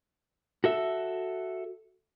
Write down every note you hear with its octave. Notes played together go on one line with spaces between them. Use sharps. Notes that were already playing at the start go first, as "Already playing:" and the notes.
F#4 A4 E5